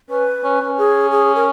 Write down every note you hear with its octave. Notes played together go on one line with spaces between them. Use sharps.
C#4 B4
C#4
C#4
G#4
G#4
A#4